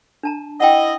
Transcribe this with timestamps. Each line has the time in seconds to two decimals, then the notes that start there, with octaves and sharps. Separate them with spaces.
0.23 D4 A5 A#5
0.60 E4 D#5 F#5 G5